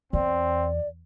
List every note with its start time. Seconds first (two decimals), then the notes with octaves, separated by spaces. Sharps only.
0.13 E2 C4 D5